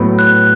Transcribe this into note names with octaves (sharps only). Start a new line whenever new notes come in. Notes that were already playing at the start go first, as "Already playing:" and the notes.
Already playing: A2 F#3 B3
F#6